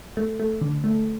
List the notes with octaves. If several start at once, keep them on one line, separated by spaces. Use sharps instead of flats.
A3
A3
D3
A3